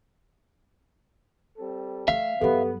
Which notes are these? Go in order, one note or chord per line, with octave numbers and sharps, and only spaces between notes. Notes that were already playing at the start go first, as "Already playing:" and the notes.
G3 C4 A4
A3 E5 F5
G2 F#3 B3 G4 A4